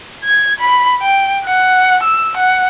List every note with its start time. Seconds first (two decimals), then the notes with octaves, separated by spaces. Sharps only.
0.24 G#6
0.60 B5
1.02 G5
1.45 F#5
2.03 E6
2.37 F#5